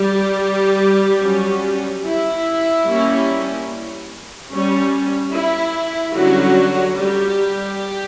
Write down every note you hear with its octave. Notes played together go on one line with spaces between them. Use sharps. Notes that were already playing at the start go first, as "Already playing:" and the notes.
Already playing: G3 G4
F#3 C#4
E4
G3 A#3 C#4
G3 C#4
E4
D3 F#3 G3 C#4 F#4
G3 G4